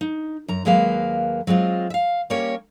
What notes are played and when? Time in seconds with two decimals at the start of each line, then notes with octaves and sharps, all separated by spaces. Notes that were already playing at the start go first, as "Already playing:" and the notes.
0.01 D#4
0.48 F#2 A#5
0.65 D#2 F#3 G#3 A#3 B4 F5
1.47 F#3 G#3 C4 F4
1.90 E5 F5
2.30 G3 A#3 C#4 G4 A#4 C#5